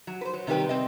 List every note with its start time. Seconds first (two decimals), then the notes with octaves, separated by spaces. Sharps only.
0.07 F#3
0.21 B4 C5
0.33 F#3
0.47 C3 D#3 G3 G4 B4 G5
0.69 C4 D#5